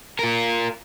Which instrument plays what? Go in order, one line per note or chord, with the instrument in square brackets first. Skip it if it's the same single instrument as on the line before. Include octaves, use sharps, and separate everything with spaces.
[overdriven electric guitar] F4 A#4